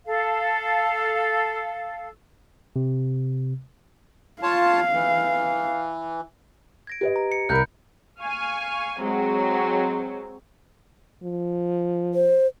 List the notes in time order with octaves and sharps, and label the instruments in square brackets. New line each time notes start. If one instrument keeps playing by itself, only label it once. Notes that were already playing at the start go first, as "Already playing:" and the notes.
[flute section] A4 F5
[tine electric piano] C3
[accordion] F4 C#5 A5 [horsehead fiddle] F5
[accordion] E3
[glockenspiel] G#6 A#6 D7
[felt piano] G4 B4 D#5
[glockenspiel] A#5
C#7
[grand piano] C2 A#4 B5 [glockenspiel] F#6 G6
[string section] F5 G#5 C#6
F#3 G#3 C4
[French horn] F3
[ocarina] C5